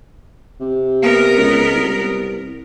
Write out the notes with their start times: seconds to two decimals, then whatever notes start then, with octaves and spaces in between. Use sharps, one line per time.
0.60 C3
1.01 B3 A#4
1.37 C#2
1.74 C2